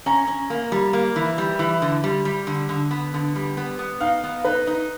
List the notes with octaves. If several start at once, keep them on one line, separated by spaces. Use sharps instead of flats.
C#4 A#5
C#4
A#3
G3
A#3
E3
G3
E3
D3
G3
G3
D3
D3
B3
D3
G3
B3
B3
D#4 F5
B3
D#4 B4
D#4